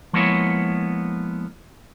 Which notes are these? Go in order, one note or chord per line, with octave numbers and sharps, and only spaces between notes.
F3 G#3 A#3 B3 E4 C#5